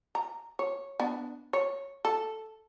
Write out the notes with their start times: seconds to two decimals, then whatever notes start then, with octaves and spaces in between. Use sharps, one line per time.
0.15 A#5
0.59 C#5
1.00 B3 D4
1.53 C#5
2.05 A4